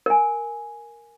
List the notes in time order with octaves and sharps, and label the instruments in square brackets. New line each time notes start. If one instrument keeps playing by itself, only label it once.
[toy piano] A#4 G#5